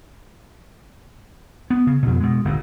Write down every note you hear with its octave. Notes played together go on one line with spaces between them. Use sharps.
B3
C#3
F2 B2
B2 G#3
G1 D2 A#2